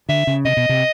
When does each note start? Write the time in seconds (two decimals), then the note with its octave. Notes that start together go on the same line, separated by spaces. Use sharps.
0.09 D3 E5
0.27 C#3
0.45 C3 D#5
0.57 B2
0.69 C3